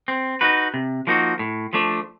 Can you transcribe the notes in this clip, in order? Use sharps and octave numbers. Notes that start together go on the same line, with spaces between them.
C4
D#4 F#4 B4
C3
F3 A#3 D#4 F#4
A2
F3 A3 D4